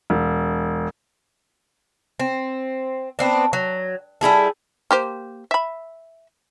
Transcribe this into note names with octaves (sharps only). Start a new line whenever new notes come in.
E1
C4
B3 C4 D4
F#3
G3 E4 G#4 A4
A#3 G4 C5
E5 B5